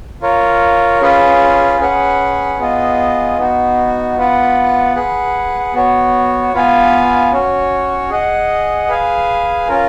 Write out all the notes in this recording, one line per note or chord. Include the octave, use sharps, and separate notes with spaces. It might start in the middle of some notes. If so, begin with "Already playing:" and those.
F4 A#4 C#5
C#4 F4 G#4 B4
C#4 G#4 B4 F#5
B3 F4 G#4 D#5
B3 D#4 F#4
B3 F4 B4 F#5
G#4 B4 F#5
B3 F#4 C#5
B3 F4 B4 F5 G#5
C#4 F#4 C#5
G#4 D#5 F#5
G#4 B4 F5 G#5
C#4 F4 A#4